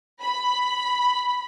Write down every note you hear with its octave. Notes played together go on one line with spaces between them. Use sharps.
B5